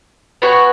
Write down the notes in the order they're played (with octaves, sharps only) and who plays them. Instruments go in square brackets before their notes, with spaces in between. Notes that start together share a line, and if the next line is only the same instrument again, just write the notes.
[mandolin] B3 F#4 C#5 G#5